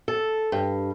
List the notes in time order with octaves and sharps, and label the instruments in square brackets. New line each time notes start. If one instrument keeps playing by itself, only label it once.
[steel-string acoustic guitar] A4
G2